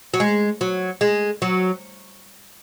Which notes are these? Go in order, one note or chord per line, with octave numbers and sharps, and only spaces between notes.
F#3
G#3
F#3
G#3
F#3